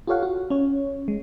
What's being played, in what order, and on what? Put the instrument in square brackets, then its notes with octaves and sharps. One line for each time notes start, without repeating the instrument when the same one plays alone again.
[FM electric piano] F4 G4 A4 C#5 F5 F#5
F#4
C#4 C#5
G#3